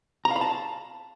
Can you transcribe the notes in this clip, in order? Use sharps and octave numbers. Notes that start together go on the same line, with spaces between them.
A#5
F5
B5
A5